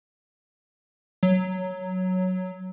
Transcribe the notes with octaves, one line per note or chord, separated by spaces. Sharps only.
F#3